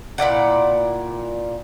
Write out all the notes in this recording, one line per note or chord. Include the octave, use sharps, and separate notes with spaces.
A#2 E4 D5 F#5